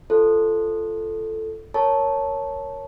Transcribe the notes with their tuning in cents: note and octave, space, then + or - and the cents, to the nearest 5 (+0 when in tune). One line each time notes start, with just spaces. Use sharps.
F4 -20 A4 +0 C5 +0
A#4 +0 C#5 +0 A5 -5